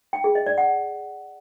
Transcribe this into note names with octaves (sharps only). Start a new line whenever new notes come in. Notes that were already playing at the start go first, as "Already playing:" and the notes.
G5
G#4
D#5
D5
F#5